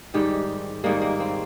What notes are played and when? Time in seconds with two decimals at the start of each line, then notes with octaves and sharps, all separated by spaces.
0.14 G#2 D#3 G3 G4
0.84 G#2 D#3 G3 A#3
1.01 A#3
1.20 C4